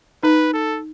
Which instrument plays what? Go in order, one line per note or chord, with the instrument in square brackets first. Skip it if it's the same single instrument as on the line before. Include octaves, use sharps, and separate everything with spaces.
[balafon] D#4 [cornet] B4
[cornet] A4